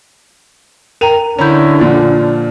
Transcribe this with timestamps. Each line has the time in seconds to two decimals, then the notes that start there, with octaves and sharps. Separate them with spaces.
1.01 A#4 G5 A#5 D#7 F7
1.39 D3 C#4 E4 A#5 B5 G6
1.80 A#2 F3 D4